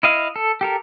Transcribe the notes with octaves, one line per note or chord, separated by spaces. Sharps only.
E4 D#5 F5
A4
G4 A4 A#4